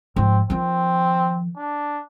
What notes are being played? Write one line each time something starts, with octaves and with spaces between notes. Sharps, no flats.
G#2 F3 C4
D#3 F3 C4
D4